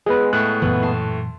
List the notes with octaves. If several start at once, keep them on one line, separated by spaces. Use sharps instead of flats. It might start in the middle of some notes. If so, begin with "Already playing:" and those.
G#3 B3 G#4 B4
A2 A3 F#6
F#2 A#2 E3 B3
A5 C6